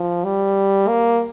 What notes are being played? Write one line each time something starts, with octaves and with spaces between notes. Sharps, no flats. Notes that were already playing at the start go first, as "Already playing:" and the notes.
Already playing: F3
G3
A#3